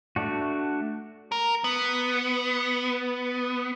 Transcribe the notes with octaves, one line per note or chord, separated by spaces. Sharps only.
A3 D4 F#4
A#4
B3